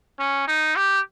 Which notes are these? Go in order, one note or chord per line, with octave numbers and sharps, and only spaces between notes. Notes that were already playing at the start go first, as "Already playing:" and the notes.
C#4
D#4
G4